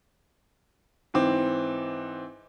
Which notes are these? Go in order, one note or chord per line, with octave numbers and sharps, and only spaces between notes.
G#2 E3 C4 D6